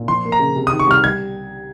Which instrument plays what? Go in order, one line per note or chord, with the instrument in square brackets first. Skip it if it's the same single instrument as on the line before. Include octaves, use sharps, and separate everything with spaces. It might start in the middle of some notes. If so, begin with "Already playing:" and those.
Already playing: [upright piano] A#2
[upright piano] F3 [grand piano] C6
[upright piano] A#3
[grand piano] A#5
[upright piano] C#3
C3
[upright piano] D#3 [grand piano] D#6
[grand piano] C#6
[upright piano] C2 [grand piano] F6
[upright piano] G3 [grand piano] G#6